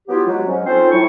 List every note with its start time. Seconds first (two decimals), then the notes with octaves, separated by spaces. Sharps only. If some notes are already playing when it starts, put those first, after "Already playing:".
0.08 F#3 B3 E4 F4 G4
0.27 F#3 G#3
0.47 G#2 F#3 C#4
0.66 C4 C#4 D#4 F4 A4 C5
0.91 A2 F#3 E4 C#6